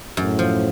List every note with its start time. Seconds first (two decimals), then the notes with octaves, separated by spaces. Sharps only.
0.17 F#2 A2
0.39 F3